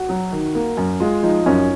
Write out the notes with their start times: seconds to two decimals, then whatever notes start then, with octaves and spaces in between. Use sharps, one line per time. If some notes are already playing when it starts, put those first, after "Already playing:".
Already playing: F#4
0.09 F#3
0.32 D#3
0.55 A#3
0.77 F#2
1.00 G#3 F4
1.23 F3 D#4
1.46 F#2 C#4